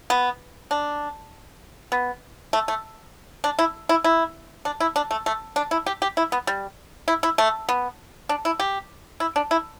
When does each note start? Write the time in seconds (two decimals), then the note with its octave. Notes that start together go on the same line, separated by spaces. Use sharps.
0.10 B3
0.71 D4
1.92 B3
2.53 A3
2.68 A3
3.44 D4
3.59 E4
3.89 E4
4.04 E4
4.65 D4
4.80 E4
4.96 D4
5.11 A3
5.26 A3
5.56 D4
5.71 E4
5.86 G4
6.02 G4
6.17 E4
6.32 B3
6.47 G3
7.08 E4
7.23 E4
7.38 A3
7.69 B3
8.29 D4
8.45 E4
8.60 G4
9.20 E4
9.36 D4
9.51 E4